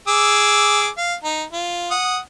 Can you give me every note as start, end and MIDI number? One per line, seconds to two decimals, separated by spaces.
0.08 0.88 68
0.08 0.88 86
0.08 0.88 88
0.98 1.14 77
1.24 1.43 63
1.53 1.91 65
1.91 2.18 78
1.91 2.18 87